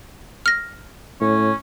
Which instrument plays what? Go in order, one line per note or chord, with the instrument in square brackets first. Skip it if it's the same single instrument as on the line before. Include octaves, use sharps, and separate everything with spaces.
[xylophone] F6 A#6
[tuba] A2 [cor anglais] C#4